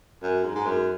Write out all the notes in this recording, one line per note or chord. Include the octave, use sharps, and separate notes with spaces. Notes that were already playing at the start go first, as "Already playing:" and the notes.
F#2
G#2
G#2
F#2